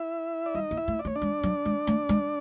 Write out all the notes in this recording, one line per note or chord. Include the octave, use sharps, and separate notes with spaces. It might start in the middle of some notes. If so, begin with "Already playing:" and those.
Already playing: E4 E5
D5
G3 D#4 D#5
A#3
E4 E5
A3
D5
A3 C#5
D4 D5
G#3
F#3
G#3
A3
G#3